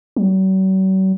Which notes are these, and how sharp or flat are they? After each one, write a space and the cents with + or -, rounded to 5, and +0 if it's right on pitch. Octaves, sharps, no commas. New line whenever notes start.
F#3 +45